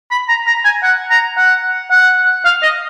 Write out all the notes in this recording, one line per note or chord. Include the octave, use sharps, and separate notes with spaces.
B5
A#5
A#5
G#5
F#5
A#5
F#5
F#5
F5
D#5